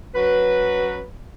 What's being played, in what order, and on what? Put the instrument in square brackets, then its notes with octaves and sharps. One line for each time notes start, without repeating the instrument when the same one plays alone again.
[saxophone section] F#3 C#4 B4